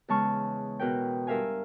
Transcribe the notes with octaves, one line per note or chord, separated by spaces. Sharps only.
E2 C#3 G#3 A5 C#6 F6
B2 A#4 B4 G5
G2 A#4 E5 F5 G#5